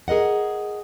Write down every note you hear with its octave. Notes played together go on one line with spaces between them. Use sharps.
G#4 A#4 D#5 F#5